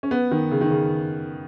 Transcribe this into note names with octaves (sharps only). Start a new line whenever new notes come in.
C#4
B3
D#3
C#3
D#3
C#3